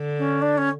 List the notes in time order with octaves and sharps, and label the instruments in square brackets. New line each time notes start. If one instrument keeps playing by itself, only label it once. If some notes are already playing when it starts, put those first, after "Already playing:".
Already playing: [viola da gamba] D3
[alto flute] C#4
D4
C#4